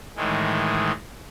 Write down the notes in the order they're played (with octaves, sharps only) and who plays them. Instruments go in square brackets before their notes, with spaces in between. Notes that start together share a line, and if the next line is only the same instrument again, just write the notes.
[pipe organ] A2 D#3 E3 G#3